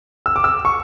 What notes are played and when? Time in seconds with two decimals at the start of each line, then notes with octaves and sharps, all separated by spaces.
0.26 E6
0.36 D6
0.44 E6
0.65 C#6